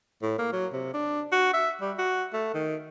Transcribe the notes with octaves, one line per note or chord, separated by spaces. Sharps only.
A2
A#3
F#3
C3
D4
F#4
E5
G3
F#4
A3
D#3